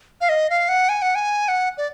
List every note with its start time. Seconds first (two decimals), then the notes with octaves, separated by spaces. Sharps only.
0.21 F5
0.29 D#5
0.50 F5
0.69 F#5
0.89 G#5
1.02 F#5
1.15 G#5
1.48 F#5
1.78 D5